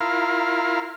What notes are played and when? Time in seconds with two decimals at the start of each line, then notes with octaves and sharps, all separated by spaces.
0.01 E4 F4 A#4 F5